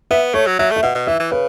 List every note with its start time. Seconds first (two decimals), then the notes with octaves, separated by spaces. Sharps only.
0.11 B3 E5
0.34 A3 C#5
0.47 F#3
0.59 F#3 E5
0.71 A3
0.76 E5
0.83 B2 F#5
0.95 B2
1.07 E3 E5
1.20 E3
1.32 C#3 B4